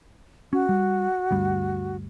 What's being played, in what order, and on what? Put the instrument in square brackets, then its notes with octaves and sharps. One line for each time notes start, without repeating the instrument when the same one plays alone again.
[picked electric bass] C#4 [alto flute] F#4
[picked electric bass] G3
D2 G2 G3